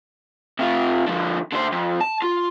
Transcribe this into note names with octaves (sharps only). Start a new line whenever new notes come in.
C3 F4
D3 F3
D3 C5
F2
A5
F4